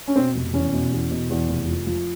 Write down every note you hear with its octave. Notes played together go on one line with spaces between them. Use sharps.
C#4
B2 C4
F1
E2 C#4
B2
E2
B2
E2
F1
F3
F3